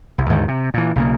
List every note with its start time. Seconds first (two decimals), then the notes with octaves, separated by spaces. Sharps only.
0.18 C2
0.30 D#2 G#2 D3 D#3
0.48 C3
0.74 A#2 E3
0.96 B1 C#3 A#3